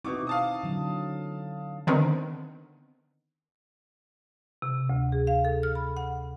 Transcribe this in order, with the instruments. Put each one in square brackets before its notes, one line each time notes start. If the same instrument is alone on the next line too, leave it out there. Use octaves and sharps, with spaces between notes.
[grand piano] B2 C#6 D6 [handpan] C4 D#4 E4
[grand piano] F5 A5 D#6
[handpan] D3 F#3
[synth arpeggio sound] D3 D#3 B3 C4
[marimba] C3
D2
G#4
F5
A4
F6
B5
F#5